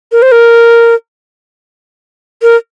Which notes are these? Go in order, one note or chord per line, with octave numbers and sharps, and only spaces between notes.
A#4
C5
A#4
A#4